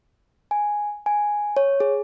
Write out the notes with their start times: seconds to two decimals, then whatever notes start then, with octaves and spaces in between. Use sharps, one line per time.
0.51 G#5
1.06 G#5
1.57 C#5
1.80 G#4